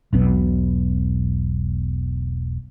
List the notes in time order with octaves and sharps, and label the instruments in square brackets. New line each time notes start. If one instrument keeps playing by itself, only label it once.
[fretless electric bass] E1 B1 B2